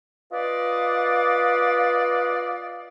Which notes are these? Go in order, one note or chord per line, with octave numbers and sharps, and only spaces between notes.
F4 B4 D5 D#5 F5